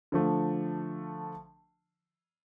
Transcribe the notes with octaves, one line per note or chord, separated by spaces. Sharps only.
D3 F3 A3